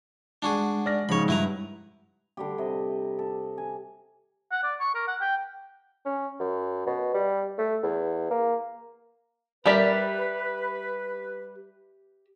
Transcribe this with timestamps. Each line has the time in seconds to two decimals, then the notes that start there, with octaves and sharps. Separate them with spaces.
0.42 G#3 D4 F#4 G#4 F#5
0.86 D5 F6 A#6
1.09 G#2 C#3 F3 C#5 B5
1.28 G2 E4 B4 A#5
2.37 D3 G3 G4
2.58 C3 D#5
3.19 A4
3.58 G#5
4.52 F#5
4.64 D5
4.80 C#6
4.95 A#4
5.08 F#5
5.20 G5
6.06 C#4
6.40 F#2
6.87 B2
7.14 G3
7.58 A3
7.83 E2
8.31 A#3
9.66 G3 G4 A#4 B4 D5 E5